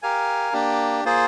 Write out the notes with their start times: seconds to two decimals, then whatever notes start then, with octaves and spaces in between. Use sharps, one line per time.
0.02 G4 A#4 F5 G#5
0.53 A#3 D4 G4
1.05 A#3 F4 G#4 C5